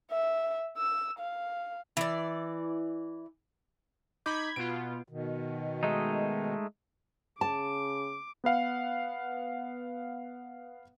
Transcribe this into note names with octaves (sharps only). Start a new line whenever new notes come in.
E5
E6
F5
E3 D5
D#4 B5 D6 G6 G#6
B2 B3 F4 D7
B2 D#3
G#3 A3 D#4
C#3 A5 D6
B3 B4 F5 F#5